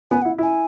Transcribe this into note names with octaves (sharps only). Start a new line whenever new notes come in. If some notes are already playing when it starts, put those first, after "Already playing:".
B3 G#5
E4 F#5
E4 G#5